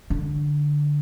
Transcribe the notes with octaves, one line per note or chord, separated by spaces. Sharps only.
D3